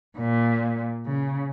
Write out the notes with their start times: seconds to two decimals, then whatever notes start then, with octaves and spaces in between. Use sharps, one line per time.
0.17 A#2
1.06 C#3